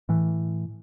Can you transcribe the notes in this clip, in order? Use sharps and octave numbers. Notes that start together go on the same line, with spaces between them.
A2 E3